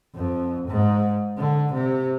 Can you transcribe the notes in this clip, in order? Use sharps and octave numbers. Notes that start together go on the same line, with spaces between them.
F2
G#2
D3
C3